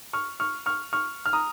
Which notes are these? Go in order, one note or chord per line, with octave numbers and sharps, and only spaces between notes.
C#6 F6
C#6 F6
C#6 F6
C#6 F6
F6
A#5 D#6